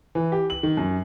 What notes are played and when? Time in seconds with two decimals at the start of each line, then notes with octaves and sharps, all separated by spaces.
0.15 E3
0.32 G4
0.50 F#7
0.63 D#3
0.77 F#2